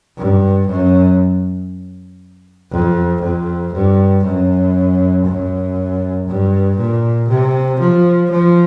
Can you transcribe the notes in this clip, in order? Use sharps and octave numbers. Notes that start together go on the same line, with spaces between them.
G2
F#2
F2
F2
G2
F#2
F#2
G2
A#2
C3
F3
F3